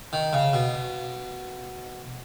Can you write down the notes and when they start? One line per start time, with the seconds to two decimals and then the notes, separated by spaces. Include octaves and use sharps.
0.13 D#3
0.33 C#3
0.54 B2